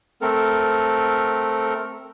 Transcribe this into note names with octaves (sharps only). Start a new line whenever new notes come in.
A3 C4 A4 A#4